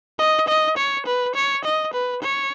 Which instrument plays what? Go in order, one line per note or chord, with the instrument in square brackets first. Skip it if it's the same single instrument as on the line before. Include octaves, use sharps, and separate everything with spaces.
[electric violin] D#5
D#5
C#5
B4
C#5
D#5
B4
C#5